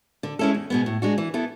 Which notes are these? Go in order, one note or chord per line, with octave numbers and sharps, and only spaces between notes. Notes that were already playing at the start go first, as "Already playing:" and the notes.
D3
G#3 C#4 E4 A4
E2
B2 G#3 B3
A2
G#3 D4 F#4
E3
B3 E4 A4